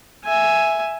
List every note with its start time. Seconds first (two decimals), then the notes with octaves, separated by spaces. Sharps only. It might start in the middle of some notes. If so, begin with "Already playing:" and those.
0.24 E5 G#5